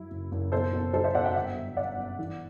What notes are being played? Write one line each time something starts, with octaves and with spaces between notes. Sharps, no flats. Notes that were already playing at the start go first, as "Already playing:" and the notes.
Already playing: F#2 F#3 E4
F#1
F#1
B2 A4 C5
B2
F#3 A4 C5
C5 E5
B2 D5 F#5
E5 G5
G1 E5 G5
G1
G1 D5 F#5
F#2
E3